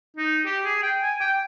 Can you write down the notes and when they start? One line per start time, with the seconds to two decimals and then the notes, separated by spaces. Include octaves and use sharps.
0.17 D#4
0.46 G4
0.65 G#4
0.83 G5
1.02 G#5
1.21 G5